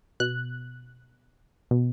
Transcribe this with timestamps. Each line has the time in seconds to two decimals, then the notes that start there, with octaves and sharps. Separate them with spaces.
0.20 B2 F#6
1.71 B2